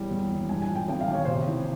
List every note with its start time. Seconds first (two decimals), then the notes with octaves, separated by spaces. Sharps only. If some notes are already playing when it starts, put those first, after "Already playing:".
Already playing: E1 E3 G3 G5
0.10 E2
0.30 E2
0.49 G2 G#5
0.62 G#5
0.69 F3
0.75 G5
0.88 G#1 G5
1.01 F5
1.08 G#1
1.14 C#5
1.25 C3 C5
1.35 C#5
1.47 E3